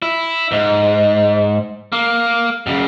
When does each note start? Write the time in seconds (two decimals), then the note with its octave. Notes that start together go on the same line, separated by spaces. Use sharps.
0.02 E4
0.52 G#2
1.92 A#3
2.67 F#2 C#3